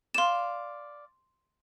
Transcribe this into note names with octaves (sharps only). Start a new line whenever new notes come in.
D5 F5 C6 E7